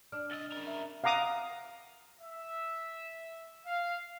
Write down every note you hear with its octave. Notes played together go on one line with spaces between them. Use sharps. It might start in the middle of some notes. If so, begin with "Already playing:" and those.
D4 F6
C2 D#5 E6 A6
C#3 A#4
E5
F5 F#5 A#5 D6 D#6
E5
F5